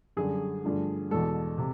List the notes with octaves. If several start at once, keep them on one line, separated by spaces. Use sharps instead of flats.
F#2 D3 G3 G#4
G2 D3 F3 A3
E2 B2 G#3 A4
C3